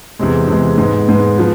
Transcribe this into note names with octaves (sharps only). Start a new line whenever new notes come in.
E2 C3 G#3
E2 C3 G#3
G#2 G#3 B3
G#2 G#3 B3
F3 B3